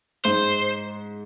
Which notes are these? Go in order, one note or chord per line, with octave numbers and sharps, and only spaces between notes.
G#2 C5